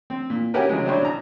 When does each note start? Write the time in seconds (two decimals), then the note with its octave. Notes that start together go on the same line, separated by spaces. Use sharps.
0.10 C4
0.30 A#2
0.54 C#4 E4 F#4 G4 A#4 B4
0.69 C#3 F#3 G#3
0.85 F#3 G3 D4 E4 C5 C#5
1.02 B2 A#5